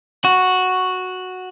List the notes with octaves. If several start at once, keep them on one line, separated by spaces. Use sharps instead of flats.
F#4